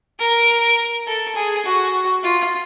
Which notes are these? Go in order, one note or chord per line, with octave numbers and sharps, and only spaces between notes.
A#4
A4
G#4
F#4
F4